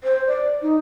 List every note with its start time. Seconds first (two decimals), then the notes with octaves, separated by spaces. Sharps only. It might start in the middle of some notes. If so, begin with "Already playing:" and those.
0.04 C5
0.27 D5
0.62 D#4